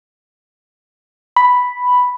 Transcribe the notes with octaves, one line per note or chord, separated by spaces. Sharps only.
B5